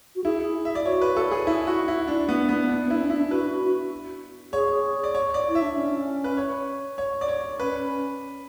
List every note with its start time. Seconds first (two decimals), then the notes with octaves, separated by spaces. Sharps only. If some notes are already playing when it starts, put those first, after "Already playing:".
0.16 F#4
0.24 E4 G#4
0.65 E5
0.75 D5
0.85 F#4 C#5
1.01 B4
1.17 A4
1.31 G#4
1.47 E4
1.67 F#4
1.88 E4
2.07 D4 E4
2.29 B3
2.49 B3
2.69 D4
2.85 B3
2.90 E4
2.99 C#4
3.10 E4
3.16 D4
3.30 F#4 B4
4.53 G#4 C#5
5.04 D5
5.14 C#5
5.34 D5
5.49 E4
5.55 E5
5.62 D4
5.76 C#4
6.24 B4
6.37 C#5
6.98 C#5
7.21 D5
7.28 C#5
7.60 C#4 B4